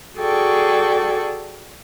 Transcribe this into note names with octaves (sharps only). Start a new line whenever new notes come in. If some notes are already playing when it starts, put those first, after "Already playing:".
F#4 G#4 A4 D5 G5 C#6